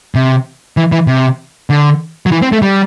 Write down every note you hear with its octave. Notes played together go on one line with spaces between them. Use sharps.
C3
E3
E3
C3
D3
F#3
E3
C4
A3
G3